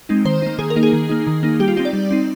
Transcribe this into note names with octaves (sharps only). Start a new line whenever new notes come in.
G#3 C4 D#4
D#3 C5
A#3 D#4
D#3 G#4
A#4
A#3 D#4
G#4
D#3
A#3 D#4
D#3
A#3 D#4
G3 G4
F4
C4 D#4 G4
D5
G3
C4 D#4